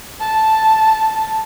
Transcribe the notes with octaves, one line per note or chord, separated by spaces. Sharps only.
A5